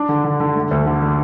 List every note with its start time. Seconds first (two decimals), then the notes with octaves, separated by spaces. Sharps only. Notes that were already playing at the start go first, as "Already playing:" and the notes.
Already playing: D4
0.09 D3
0.24 D3
0.40 D3
0.55 A3
0.71 D2
0.86 D3
1.02 D3